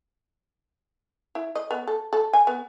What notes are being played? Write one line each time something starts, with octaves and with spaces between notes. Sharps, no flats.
E4
D#5
B3
A4
A4
G#5
B3